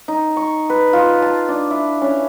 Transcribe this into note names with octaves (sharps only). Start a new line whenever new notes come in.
D#4
C#6
B4
F4
A5
D4
E4
C#4